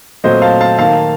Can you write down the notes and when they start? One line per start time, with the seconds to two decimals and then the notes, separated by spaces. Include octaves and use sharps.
0.24 A#2 F#3 A3 C4 C5 D#5
0.42 F5 A5
0.61 F5 A5
0.79 D#3 A#3 F5 A5